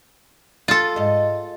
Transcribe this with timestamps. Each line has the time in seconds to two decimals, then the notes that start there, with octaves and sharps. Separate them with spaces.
0.68 F4 A4
0.96 G#2 D#5